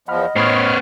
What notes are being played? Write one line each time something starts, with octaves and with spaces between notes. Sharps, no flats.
E2 F3 D#5 F#5 B5 F6
A2 B3 C5 C#5 B5 D#6 F6